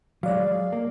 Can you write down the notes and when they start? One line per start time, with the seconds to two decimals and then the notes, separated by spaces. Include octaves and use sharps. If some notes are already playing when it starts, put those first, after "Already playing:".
0.23 F#3 G#3 D5 F5
0.73 A#3